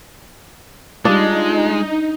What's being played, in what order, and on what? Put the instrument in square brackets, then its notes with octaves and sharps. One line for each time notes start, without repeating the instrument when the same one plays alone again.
[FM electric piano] G3 F4 [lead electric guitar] G#3 [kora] D4 [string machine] D#4